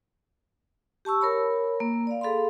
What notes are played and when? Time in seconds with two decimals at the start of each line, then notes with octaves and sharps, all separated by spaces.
1.05 G4 A5 C#6 E6
1.21 A#4 C#5 B5
1.80 A#3
2.07 D5 F5
2.21 G#4 A4 F5 B5 C6